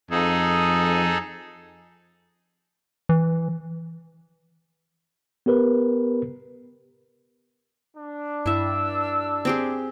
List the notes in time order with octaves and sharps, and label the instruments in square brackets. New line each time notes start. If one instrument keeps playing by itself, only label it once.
[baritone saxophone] F2 [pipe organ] D#4 G#4 A4
[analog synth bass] E3
[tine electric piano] B3 G4 A#4 B4
[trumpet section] D4
[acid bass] G2 [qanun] E4 E5 [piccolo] E6
[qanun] C4 G4 G#4